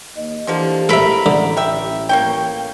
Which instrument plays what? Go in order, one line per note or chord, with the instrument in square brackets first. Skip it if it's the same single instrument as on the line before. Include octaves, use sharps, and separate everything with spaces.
[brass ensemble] D#2 D#5
[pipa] D3 F3 A#3 [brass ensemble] E3 G4
[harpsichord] A4 E5 [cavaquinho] A#4 B5
[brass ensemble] A1 [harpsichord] D3
[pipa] G4 E5
A#3 C#5 G5